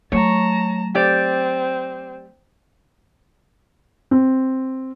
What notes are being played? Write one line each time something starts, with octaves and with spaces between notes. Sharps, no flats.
F#3 A3 C#5 A5 A#5
C4 G4 D5
C4